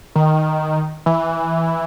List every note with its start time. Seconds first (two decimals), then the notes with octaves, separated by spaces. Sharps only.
0.16 D#3
1.06 E3